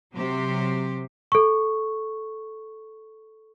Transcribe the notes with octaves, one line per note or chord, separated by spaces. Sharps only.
C3 F#3 G4 C5
A4 C#6